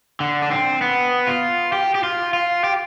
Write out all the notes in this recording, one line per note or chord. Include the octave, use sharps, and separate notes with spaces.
D3
D4
C4
B3
F4
G4
G4
F4
F4
G4